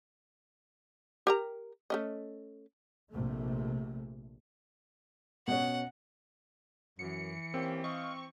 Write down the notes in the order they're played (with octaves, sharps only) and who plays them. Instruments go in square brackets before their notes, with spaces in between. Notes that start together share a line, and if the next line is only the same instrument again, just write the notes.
[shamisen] G4 A#4 A#5
A3 C#4 D#5
[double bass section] A#1 C3 A3
[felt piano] B2 C#4 [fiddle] F#5
[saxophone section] F#2 [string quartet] E3 [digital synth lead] C#7
[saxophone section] A#3 C#4 G4 [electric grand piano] C4
[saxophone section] D#5 F5 [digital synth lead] C#6